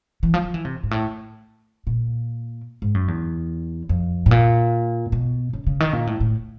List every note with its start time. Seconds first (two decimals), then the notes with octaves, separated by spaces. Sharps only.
0.23 E3
0.34 F3
0.44 F3
0.54 E3
0.65 C3
0.83 G#2
0.91 A2
1.87 A#2
2.82 G#2
2.95 F#2
3.08 E2
3.89 F2
4.26 A2
4.31 A#2
5.12 B2
5.53 C#3
5.67 C#3
5.80 D#3
5.93 A#2
6.07 A2
6.20 A2